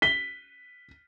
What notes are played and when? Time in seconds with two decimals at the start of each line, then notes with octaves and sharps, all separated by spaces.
0.02 B6 G7